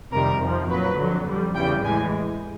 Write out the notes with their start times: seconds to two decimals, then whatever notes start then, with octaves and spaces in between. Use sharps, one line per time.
0.12 F2 C3 D#3 G3 A#4
0.41 F2 C3 F3
0.70 A#2 F#3 B4
0.98 F2 D3 F#3
1.26 F2 D3 G3
1.55 E2 C#3 E3 G3 G5
1.83 A2 E3 G#3 G#5